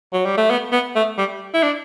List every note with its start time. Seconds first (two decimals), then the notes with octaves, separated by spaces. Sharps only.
0.13 F#3
0.25 G3
0.37 A3
0.50 B3
0.72 B3
0.95 A3
1.18 G3
1.54 E4
1.63 D4